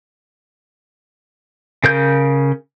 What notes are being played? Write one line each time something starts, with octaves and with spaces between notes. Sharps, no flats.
C#3 A#4 G6